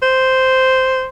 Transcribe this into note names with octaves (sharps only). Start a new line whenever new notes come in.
C5